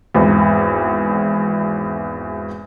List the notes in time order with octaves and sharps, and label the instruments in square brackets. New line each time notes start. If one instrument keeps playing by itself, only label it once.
[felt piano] G#1 E2